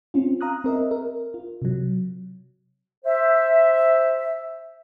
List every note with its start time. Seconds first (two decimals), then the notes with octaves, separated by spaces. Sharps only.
0.14 C4 C#4 F4
0.41 F5 A#5 D#6 F#6
0.64 C4 A#4 D#5 E5
0.91 A#4
1.34 F4
1.62 C3 F#3
3.05 C5 E5